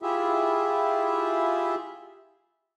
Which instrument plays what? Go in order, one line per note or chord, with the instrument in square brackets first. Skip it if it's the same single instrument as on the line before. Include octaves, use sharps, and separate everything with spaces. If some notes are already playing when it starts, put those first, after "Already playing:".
[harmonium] E4 F4 G4 G#4 E5